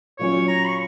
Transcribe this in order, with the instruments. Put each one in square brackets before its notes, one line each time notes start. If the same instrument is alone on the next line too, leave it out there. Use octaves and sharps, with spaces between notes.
[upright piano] A#2 F#3 C#4 [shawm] C#5
[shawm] A#5
C#6